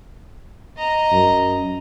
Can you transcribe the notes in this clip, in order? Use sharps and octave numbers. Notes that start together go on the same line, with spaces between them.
D#5 A#5
F#2